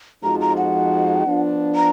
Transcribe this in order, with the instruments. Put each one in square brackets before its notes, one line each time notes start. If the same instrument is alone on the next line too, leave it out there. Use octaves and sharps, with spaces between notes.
[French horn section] F2 F3 G#3 D#4 F#4 [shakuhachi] A#5
[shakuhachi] A#5
F#5
[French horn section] F3 B3 D4 F4
[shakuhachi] A#5